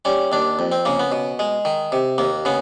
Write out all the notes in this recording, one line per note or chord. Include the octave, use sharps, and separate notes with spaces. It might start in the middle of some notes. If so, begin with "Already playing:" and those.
G3 C#4
D#2 D4
F2
C4
C#3 A#3
B3
B2
G#3
D#3
C3
D#2 A#3
C#3 B3